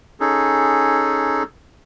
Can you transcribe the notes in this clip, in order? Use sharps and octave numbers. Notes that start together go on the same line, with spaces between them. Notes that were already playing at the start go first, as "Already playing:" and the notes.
C#4 D#4 G#4 A4